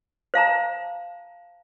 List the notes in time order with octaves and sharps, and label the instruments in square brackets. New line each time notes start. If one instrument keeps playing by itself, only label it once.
[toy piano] C5 F5 A5 A#5